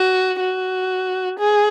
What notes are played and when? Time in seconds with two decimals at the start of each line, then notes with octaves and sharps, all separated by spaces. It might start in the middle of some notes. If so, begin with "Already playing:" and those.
Already playing: F#4
0.40 F#4
1.39 G#4